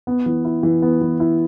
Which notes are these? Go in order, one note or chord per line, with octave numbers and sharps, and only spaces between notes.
B3
E3
E4
E3
B3
E3
E4